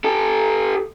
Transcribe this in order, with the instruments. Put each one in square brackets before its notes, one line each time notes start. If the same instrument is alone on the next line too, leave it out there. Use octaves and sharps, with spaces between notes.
[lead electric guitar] G4 A4